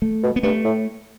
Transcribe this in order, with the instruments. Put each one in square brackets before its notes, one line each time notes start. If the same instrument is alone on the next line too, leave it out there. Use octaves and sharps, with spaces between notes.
[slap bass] A3
[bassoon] B2
[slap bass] B3
[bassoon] G2 [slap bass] A3
[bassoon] A2